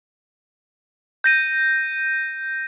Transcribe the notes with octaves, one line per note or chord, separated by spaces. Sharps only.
G6 A#6 D#7